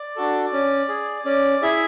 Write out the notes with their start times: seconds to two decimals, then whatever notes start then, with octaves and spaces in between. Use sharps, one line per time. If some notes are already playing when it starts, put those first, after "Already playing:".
Already playing: D5
0.16 D4 F#4 A4
0.53 C#4
0.89 G#4
1.25 C#4 D5
1.62 E4 G#4 E5